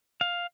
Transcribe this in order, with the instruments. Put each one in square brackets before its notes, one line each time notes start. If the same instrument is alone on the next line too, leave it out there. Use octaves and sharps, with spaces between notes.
[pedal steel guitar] F5